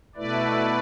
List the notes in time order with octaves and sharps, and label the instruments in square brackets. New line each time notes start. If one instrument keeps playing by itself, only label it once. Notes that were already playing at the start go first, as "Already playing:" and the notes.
[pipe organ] B2 A3 E4 B4 D5